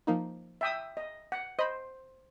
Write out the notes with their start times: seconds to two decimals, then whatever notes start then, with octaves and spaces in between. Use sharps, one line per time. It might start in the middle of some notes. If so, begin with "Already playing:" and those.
0.07 F3 A#3 D#4
0.61 E5 G5 D#6
0.97 D#5
1.32 F#5
1.59 C5 D#5 B5